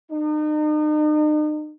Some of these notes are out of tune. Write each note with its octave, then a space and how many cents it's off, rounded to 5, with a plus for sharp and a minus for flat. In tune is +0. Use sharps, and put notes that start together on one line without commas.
D#4 -40